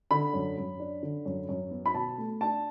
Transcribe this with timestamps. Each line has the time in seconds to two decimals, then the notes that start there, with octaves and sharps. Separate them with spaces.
0.11 D3 B5
0.33 F#2
0.58 F#2
0.80 D4
1.03 D3
1.26 F#2
1.49 F#2
1.71 B3
1.86 B5
1.94 B2 A5
2.18 A3
2.41 D4 A5